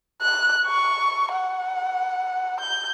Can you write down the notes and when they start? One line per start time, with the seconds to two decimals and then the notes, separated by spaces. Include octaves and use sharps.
0.22 F#6
0.66 C#6
1.32 F#5
2.61 G6